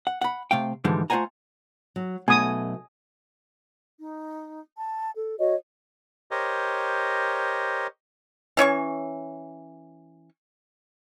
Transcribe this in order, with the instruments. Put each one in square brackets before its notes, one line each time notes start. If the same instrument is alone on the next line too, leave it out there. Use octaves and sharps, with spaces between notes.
[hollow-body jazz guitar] F#5
F#5 B5
C3 A3 F5 G5
G#2 D3 E3 F3 G3 G#3
A3 F4 C5 F#5 G#5 A#5
[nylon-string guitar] F#3
[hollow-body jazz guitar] B1 B2 [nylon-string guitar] A3 E5 [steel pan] G#5 D#6
[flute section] D#4
A5
A4
F#4 C#5 D#5
[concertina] G4 A#4 C5 C#5 D#5
[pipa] E3 C#4 C#5 C#6